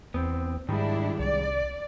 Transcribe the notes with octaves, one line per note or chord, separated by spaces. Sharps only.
E2 B3 C4
G#2 D#3 G3 G#3 D4 E4
C2 D5